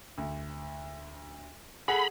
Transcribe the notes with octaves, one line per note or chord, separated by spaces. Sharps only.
D2
G#4 A4 F#5 B5